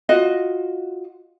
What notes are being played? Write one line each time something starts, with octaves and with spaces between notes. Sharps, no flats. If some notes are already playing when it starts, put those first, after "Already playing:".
F4 F#4 D#5